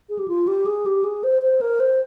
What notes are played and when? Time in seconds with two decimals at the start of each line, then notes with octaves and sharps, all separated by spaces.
0.09 G#4
0.19 G4
0.28 F4
0.47 G4
0.66 G#4
0.86 G4
1.04 G#4
1.23 C5
1.42 C5
1.61 A#4
1.80 C5